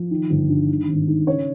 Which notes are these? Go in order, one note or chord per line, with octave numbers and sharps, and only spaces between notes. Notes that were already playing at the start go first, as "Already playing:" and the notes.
Already playing: F3
D#3
G1
G2
D#3
G#1
G#2
C#3 C#5